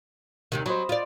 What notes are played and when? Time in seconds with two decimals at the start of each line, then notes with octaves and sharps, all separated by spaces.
0.52 D#2 C3 D#3
0.66 F#3 C5 D#5 B5
0.89 F4 D5